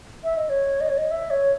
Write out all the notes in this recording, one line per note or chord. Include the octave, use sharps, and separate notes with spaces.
E5
D#5
C#5
D#5
C#5
D#5
E5
C#5